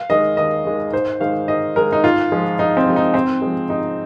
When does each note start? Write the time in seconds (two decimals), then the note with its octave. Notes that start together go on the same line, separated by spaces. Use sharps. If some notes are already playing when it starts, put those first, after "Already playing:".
Already playing: F5
0.10 D#3 G#3 D#5
0.37 D#2 D#5
0.65 D#3 G#3
0.93 G#2 C5
1.20 D#3 G#3 F5
1.48 G#2 D#5
1.76 D#3 G#3 A#4
1.92 D#4
2.03 G#2 F4
2.32 F3 G#3
2.59 G#2 D#4
2.77 C4
2.86 F3 G#3
2.96 D#4
3.14 G#2 C4
3.42 F3 G#3
3.69 G#2 D#4